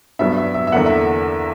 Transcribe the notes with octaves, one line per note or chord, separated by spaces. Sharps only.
G2 F#3 B3 D4 E5
E5
E5
E5
E2 D3 A#3 F#5
E5